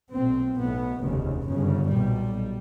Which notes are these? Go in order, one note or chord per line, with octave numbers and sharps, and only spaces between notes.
B1 A#2 C4
B1 A2 B3
F1 D#2 C#3
G1 F#2 C#3
B1 A#2 G3